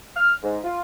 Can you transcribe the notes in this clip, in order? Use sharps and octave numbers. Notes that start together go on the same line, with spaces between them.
F6
G#2
F4